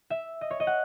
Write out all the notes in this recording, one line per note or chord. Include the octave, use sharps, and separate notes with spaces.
E5
D#5
C#5
D#5
F#5